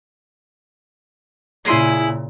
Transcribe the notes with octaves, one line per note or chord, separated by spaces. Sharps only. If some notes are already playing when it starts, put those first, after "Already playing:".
A#2 C#3 C#4 E4 G#4 C6